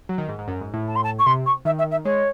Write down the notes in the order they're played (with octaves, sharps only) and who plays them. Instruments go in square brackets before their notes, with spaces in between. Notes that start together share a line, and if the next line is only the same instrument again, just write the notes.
[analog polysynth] F#3
D#3
G#2
G#2
F#2
G#2
A2
[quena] A5
C6
A5
C#6
[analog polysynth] C3 [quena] C6
[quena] C#6
[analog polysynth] D#3 [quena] E5
[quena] E5
E5
[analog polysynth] G#3 [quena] C#5